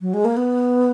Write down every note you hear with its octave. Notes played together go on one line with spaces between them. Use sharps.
F#3
G#3
A#3
B3